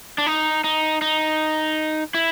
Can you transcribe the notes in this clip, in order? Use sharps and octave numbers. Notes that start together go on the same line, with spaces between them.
D4
D#4
D#4
D#4
E4